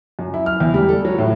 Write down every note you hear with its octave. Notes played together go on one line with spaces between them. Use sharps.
F#2
E4
F6
E2
G3
A4
F#3
A2